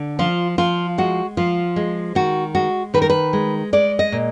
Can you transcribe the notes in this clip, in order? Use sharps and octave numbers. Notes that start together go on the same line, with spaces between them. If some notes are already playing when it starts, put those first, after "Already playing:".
Already playing: D3
F3 F4
F3 F4
G#3 F#4
F3 F4
G#3
D#3 F#4
G#3 F#4
D#3 B4
A#4
B4
G#3
G#3 D5
D#5
A#2